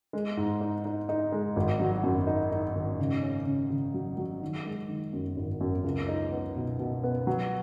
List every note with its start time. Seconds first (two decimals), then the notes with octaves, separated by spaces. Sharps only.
0.13 G#3
0.37 G#2
0.61 D#4
0.85 D#4
1.09 D#4
1.32 G#3
1.56 G#1
1.80 F#3
2.03 F#2
2.27 D#4
2.52 D#4
2.75 G#1
2.99 C#3
3.22 C#4
3.46 C#3
3.70 C#3
3.94 F#3
4.18 F#3
4.42 D#3
4.65 G#3
4.89 D#3
5.13 F#2
5.37 G#1
5.61 F#2
5.84 C#2
6.08 D#4
6.32 B3
6.56 B2
6.79 B2
7.04 B3
7.27 F#3